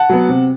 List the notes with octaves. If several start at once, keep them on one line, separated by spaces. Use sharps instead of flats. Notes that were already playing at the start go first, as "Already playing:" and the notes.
Already playing: F#5 A5
F#3 B3
C3